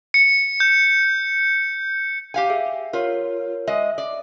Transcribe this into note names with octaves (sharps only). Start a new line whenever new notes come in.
C#7
G6
G4 F5 G#5
G#4 E5
F4 A#4 C#5
G#3 D#5 E5
D5